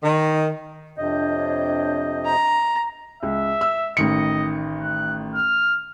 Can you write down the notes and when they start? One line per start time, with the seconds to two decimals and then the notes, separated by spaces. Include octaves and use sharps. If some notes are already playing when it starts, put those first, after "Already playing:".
0.04 D#3
0.98 F2 C3 D4 C#5 D#5 G6
2.26 A#5
3.23 C#2 E5
3.61 E6
3.97 A1 D#3 D#5 C#7
4.82 F#6
5.35 F6